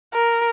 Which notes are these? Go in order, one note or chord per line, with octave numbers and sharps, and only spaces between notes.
A#4